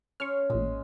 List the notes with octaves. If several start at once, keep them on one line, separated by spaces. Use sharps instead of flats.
C#4 C6 C#6 F6
A1 A#2 G#3